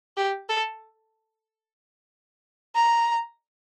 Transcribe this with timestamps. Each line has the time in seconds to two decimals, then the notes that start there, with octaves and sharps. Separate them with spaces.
0.17 G4
0.49 A4
2.75 A#5